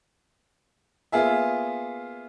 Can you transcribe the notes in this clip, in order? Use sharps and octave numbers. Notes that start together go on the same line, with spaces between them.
A#3 B3 F4 G#4 E5